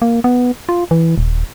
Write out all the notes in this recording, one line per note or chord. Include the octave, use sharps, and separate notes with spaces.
A#3
B3
F4
E3
D#1